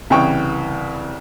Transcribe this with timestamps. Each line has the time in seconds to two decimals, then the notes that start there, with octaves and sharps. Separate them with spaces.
0.10 C2 C#3 E3 E4 G5 C#6